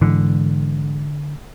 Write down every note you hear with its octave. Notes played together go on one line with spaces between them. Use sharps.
G#2 D3 E3